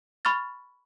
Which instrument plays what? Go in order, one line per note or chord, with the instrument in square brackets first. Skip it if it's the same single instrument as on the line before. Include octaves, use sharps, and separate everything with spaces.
[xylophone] B5 C#6 F6 A6